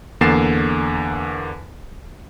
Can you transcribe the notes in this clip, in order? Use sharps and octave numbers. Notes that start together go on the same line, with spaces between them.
E2 D3 A#3 A6 C7 E7